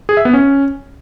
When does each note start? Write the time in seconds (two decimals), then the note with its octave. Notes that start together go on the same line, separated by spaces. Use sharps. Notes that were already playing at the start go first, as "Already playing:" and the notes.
0.09 G#4
0.17 E5
0.25 B3
0.33 C#4